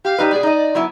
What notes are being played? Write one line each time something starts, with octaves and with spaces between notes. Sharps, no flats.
G4 F5
G3 D#4 B4
B2 G#4 D5
D#4 D#5
F#3 B3 E4